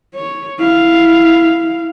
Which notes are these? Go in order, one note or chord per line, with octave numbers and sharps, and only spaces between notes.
C#5
E4 F5